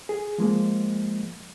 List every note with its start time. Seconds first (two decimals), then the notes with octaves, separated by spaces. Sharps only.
0.09 G#4
0.38 F3 G#3 A#3